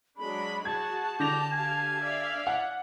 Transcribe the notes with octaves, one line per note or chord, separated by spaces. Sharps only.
F#3 G#3 D4 B5
F#4 G#4 A5 G#6
D3 G4 A#6 F7
G4 F5 G#5
D5 E5 F5
F#5